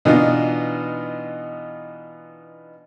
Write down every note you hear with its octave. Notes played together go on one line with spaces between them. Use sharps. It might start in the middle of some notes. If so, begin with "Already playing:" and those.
B2 E3 B3 D4 D#4 F4